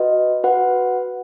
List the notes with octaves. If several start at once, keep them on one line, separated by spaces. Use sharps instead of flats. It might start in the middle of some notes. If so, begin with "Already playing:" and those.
Already playing: F#4 B4 D#5
F#4 B4 F#5